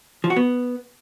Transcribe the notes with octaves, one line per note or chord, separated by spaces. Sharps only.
F3
F#4
B3